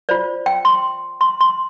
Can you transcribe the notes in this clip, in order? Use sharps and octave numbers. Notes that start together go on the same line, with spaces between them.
F4 C5 D5
G5
C6
C6
C6